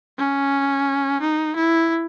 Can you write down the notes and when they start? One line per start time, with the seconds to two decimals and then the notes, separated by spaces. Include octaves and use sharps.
0.18 C#4
1.21 D#4
1.56 E4